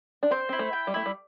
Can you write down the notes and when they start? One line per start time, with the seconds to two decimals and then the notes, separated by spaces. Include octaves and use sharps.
0.23 D4
0.31 C4 C5
0.49 C4 E4
0.59 A3
0.73 G5
0.87 G3
0.94 A3 E4
1.06 G3